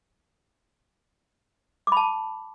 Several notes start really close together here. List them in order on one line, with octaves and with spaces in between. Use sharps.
D6 B5 A5